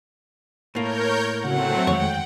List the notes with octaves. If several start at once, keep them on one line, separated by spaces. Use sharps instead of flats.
A2 A#3 A#4 C#5 G6
C#3 F#3 A3 C4 F#4 F#5
F2 D#3 G#3 C#5 G5